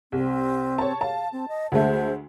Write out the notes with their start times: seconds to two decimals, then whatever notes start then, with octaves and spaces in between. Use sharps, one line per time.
0.12 C2 C4
0.78 C#5 A5
1.01 F5 A5
1.33 C4
1.48 D#5
1.72 D2 G#3 A3 C5